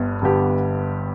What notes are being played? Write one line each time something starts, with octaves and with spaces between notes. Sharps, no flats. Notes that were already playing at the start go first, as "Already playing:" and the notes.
Already playing: G1 G2 D3 B3
G2 D3 B3 G4